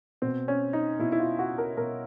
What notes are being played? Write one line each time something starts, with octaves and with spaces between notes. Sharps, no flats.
B2 C4
C#4
D#4
B2 E4
E4
F4
F#4
A#4
B2 A#4